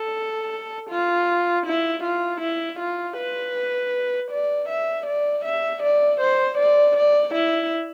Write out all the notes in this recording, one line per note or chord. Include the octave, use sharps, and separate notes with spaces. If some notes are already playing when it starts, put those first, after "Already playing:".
Already playing: A4
F4
E4
F4
E4
F4
B4
D5
E5
D5
E5
D5
C5
D5
D5
E4